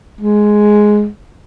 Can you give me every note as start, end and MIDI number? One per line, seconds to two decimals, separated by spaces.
0.21 1.07 56